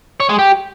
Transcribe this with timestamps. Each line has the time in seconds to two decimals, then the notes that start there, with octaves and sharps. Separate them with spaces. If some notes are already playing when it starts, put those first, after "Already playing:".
0.20 C#5
0.29 G#3
0.39 G4